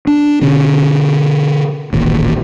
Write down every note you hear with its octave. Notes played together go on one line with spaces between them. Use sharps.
D4
B2 D3 C#4
D#1 A1 D#2